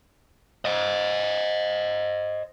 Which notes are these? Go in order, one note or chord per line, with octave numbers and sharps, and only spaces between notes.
C5 D#5